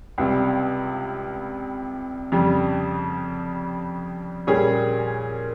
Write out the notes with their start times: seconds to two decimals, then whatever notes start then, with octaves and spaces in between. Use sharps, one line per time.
0.18 C#2 C3 G3
2.32 F2 C#3 G3
4.47 A#2 G3 C#4 G#4